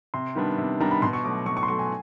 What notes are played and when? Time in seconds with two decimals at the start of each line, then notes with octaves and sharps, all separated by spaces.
0.14 C3 C6
0.35 D#3 G3 B3 D4
0.58 C3
0.80 D#3 G3 B3 D4 A#5
0.91 B5
1.02 B2 C6
1.13 C#6
1.24 F#3 A3 D6
1.46 B2 C#6
1.57 C#6
1.63 C6
1.68 F#3 A3 C#6
1.79 G#5